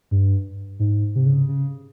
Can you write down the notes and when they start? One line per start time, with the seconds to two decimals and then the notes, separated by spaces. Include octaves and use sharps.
0.11 G2
0.80 G#2
1.16 C3
1.26 C#3
1.49 C#3